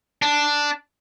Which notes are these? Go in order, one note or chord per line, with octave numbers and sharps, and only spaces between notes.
D4